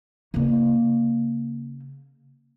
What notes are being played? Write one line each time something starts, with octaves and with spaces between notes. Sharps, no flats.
C#3 A#3